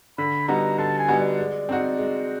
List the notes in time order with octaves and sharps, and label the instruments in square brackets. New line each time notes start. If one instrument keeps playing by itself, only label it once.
[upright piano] D3 [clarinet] B5
[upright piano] G3 B3 D#4 F#4 [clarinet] A#5
[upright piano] D3 [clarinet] A5
[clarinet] G#5
[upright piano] G3 B3 D#4 F#4
[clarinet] D5
[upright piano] G#3
C4 D#4 F#4
G#3